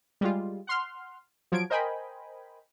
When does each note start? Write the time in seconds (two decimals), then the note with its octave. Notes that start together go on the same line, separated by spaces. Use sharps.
0.21 G3 G#3 F4
0.67 F#5 C6 F6
1.52 F3 F#3 G#6 D7
1.70 A#4 C5 D#5 G5 G#5 B5